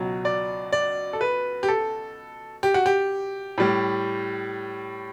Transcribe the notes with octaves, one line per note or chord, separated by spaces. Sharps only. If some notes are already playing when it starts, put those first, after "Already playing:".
Already playing: C#2 B2 F#3
D5
D5
A4
B4
G4
A4
G4
F#4
G4
A2 G3